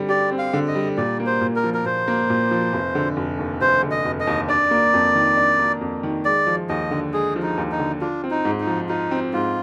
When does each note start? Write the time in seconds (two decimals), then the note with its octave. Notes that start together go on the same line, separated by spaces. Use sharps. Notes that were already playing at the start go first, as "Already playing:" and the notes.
Already playing: D3 G3 C4
0.09 G4 D5
0.31 C4
0.38 F5
0.53 D3
0.68 D#5
0.75 G3
0.97 A#2 D5
1.20 A#3
1.26 C5
1.41 A#2
1.56 A#4
1.64 F3
1.74 A#4
1.85 A#2 C5
2.08 A#3
2.30 A#2
2.51 F3
2.73 F1
2.95 D3
3.17 F1
3.39 D#2
3.61 F1 C5
3.83 D3
3.91 D#5
4.05 F1
4.20 D#5
4.27 D#2
4.49 D4 D5
4.71 A#3
4.94 F2
5.15 D#3
5.37 D4
5.59 A#3
5.81 F2
6.03 D#3
6.25 G#3 D5
6.47 F3
6.69 D#2 D#5
6.91 D3
7.13 G#3 G#4
7.36 F3
7.42 D#4
7.57 D#2
7.72 D#4
7.79 D3
8.01 D4 F4
8.24 C4
8.31 D#4
8.45 G#2
8.60 D#4
8.67 F3
8.89 D#4 F4
9.11 C4
9.33 G#2 F4